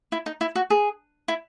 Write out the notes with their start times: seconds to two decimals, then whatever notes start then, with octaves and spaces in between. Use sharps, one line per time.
0.12 E4
0.26 D#4
0.41 E4
0.55 F#4
0.70 G#4
1.28 E4